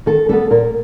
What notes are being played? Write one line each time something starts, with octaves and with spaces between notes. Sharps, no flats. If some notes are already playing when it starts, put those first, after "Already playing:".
D#3 A4
G3 B3 A4
A#2 A#4